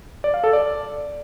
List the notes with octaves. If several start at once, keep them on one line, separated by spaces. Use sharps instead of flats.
D5
F5
A4
D5